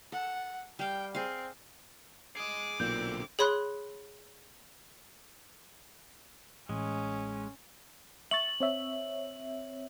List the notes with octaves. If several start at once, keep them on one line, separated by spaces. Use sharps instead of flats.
A4 F#5
G3 F5 G5
C4 G#4 F5
G#4 D#5 D6
B1 A#2 D3 C4 G6 D7
G#4 C#5 B5 C6 F#6
A1 G#3 C#4
E5 C#6 A6 F#7
C4 C#5 E5